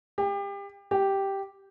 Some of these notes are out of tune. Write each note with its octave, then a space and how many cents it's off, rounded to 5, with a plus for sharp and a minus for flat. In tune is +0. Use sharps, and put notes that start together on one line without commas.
G4 +30
G4 -5